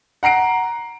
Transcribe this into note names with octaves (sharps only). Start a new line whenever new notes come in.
F#5 A#5 C7 D7